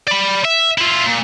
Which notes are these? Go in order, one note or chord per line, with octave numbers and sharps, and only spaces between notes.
D5 B5
E5
E4 F4
A#2